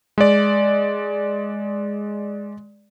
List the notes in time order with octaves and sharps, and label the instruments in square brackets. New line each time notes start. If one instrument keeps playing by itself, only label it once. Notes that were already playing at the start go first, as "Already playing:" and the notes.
[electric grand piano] G#3 D5